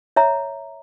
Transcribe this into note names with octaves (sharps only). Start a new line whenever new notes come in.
C#5 E5 A#5